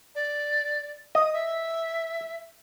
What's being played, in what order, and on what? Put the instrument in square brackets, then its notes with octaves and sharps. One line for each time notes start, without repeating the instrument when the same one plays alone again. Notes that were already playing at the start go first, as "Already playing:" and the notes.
[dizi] D5
[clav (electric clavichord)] D#5 [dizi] D#6
[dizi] E5